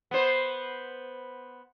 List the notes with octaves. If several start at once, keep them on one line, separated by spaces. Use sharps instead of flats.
B3 C5